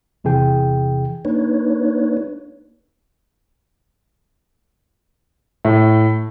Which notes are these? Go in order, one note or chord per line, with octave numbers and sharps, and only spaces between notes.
E2 C3 E3 G#4 G5
A#3 D4 D#4 B4 C#5
A2